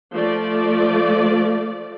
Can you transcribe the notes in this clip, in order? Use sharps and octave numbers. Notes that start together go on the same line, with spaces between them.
F3 A3 D5